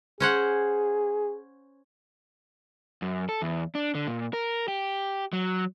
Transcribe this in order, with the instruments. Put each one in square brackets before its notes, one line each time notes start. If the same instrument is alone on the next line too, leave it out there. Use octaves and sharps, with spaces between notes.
[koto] C#4 C5 F#5 [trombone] G#4
[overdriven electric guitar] F#2
A4
E2
D4
D3
A#2
A#4
G4
F#3